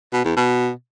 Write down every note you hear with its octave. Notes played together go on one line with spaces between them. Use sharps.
B2
E2
B2